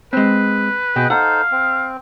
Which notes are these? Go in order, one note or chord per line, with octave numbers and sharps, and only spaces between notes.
G#3 C4 B4
B2 G#4 D#5 G5
D#4 A4 C5 F5 F#5
C4